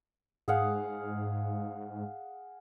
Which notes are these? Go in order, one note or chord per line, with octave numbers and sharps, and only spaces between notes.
G#2 G#4 F5 F#5